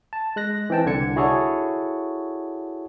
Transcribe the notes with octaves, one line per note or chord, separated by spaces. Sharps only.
A5
G#3 F#6 A#6
E3 C4 G5 A5
C2 D3 G#6 C#7
E4 F#4 G#4 A4 C#5 D5